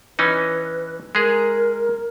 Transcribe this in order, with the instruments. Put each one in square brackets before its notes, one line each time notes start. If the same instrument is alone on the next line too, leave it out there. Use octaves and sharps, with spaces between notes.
[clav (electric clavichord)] E3 C#4 D#4 [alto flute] B4
[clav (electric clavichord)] G#3 G#4 [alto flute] A#4